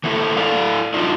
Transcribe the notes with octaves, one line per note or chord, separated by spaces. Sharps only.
E3 A3 A#3 E4 F#4 A4
E4 A4 D5 F5
F#3 D4 D#4 F4